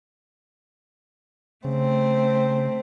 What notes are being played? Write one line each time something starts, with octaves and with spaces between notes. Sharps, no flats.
C#3 A3 C4